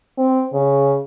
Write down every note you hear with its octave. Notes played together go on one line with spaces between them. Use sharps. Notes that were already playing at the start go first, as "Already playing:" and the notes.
C4
C#3